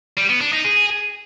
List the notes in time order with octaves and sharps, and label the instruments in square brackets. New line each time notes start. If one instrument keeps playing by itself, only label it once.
[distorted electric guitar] G3
B3
D4
D#4
G#4